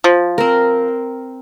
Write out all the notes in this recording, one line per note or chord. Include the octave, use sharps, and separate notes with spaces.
F3
C4 A#4